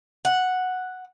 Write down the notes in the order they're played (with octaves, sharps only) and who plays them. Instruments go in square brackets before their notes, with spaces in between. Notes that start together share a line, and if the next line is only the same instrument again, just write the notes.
[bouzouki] F#5